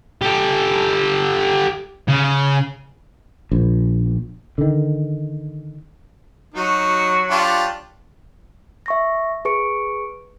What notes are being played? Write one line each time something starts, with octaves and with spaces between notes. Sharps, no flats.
G4 A4
C#3
A#1
D3 D#3
F#3 D#4 F#4
D4 F4 G4
E5 C#6 A#6
G#4 B4 C#6 C#7 D7